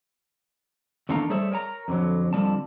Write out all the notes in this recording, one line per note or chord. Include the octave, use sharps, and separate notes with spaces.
E2 D#3 A3 D4 F5 A#5
G3 A3 G#4 C5 C#5 E5
A#4 C#5 G#5 A#5
F2 D3 F#3
F2 D3 F3 G3 A5